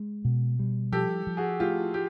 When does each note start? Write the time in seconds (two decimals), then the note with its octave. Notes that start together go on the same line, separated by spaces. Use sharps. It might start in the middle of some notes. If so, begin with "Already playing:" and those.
Already playing: G#3
0.25 B2
0.59 G3
0.92 F3 G4 A4
1.27 F3
1.37 F#4 G#4
1.60 A3 F4 G4
1.94 G4